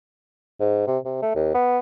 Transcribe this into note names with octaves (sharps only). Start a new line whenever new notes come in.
G#2
C3
C3
A3
D#2
B3